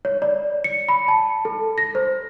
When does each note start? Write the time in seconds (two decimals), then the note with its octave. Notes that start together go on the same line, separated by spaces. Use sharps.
0.05 C#5
0.22 D5
0.64 C#7
0.89 B5
1.08 A5
1.45 A4
1.78 A#6
1.95 C5